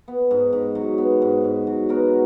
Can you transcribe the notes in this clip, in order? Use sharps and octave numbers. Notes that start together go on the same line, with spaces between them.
B3
G#2
G#2
F#3
B3
G#2
G#2
F#3
B3 F#4 A#4